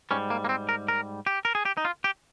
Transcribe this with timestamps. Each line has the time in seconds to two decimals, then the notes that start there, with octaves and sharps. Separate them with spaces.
0.11 G#2 G3 C#4
0.30 A#3
0.45 A#3
0.49 C4
0.69 A#4
0.88 A#4
1.27 G4
1.45 A#4
1.55 G#4
1.65 G4
1.77 D#4
1.85 F4
2.04 G4